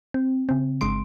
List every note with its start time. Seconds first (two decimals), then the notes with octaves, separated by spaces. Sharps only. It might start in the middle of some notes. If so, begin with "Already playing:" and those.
0.14 C4
0.49 C#3 C4
0.81 G1 G#3 C6 D7